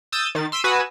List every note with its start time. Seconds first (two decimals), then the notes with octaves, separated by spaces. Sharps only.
0.12 D#6 E6 G6 A6
0.35 D#3 A6
0.52 C6 E6 B6 D7 D#7
0.64 F#4 B4 G#5 D#6 E6